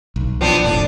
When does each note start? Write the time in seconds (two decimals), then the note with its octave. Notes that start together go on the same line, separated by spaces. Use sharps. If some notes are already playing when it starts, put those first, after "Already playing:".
0.16 B1
0.41 B1 F3 B3 C4 D4
0.64 E1 A2 D4